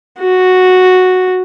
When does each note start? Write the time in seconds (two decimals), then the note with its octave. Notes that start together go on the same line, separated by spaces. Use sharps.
0.20 F#4